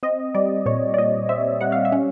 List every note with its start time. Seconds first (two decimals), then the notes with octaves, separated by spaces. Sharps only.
0.03 C4 D#5
0.35 G3 D5
0.66 A#2 C#5
0.94 D5
0.98 A#2 D#5
1.29 C4 E5
1.61 G3 F#5
1.72 F5
1.85 E5
1.92 C#4